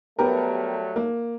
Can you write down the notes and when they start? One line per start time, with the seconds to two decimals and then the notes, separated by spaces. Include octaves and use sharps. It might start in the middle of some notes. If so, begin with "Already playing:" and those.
0.19 F#3 G3 A3 B3 G4 A#4
0.96 A#3